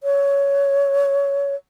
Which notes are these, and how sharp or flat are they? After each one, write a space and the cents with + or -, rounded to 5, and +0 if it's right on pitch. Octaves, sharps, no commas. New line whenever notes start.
C#5 +15